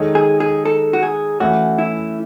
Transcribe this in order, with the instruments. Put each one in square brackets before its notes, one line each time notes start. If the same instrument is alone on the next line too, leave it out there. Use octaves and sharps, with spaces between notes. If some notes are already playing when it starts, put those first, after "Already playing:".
Already playing: [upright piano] D#3 G#3 D#4 A4 C#5
[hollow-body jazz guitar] G#4
G#4
A4
F#4
G#4
[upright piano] E3 A3 C#4 [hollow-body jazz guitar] F#4
[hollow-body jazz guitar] E4